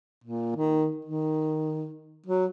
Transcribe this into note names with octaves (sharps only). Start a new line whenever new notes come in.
A#2
D#3
D#3
F#3